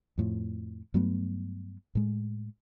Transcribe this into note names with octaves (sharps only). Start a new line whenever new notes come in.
F2 A2 F3
G2 F#3 A3 B3
A2 G#3